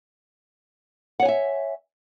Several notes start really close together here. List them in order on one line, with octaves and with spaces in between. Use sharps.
F#5 C#5 G#5 E5